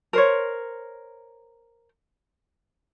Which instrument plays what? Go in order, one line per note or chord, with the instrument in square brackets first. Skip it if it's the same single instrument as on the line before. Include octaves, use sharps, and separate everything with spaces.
[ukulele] A#4 C5 C#5